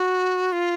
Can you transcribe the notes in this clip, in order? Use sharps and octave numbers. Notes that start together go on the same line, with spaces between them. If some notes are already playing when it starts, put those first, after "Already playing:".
Already playing: F#4
F4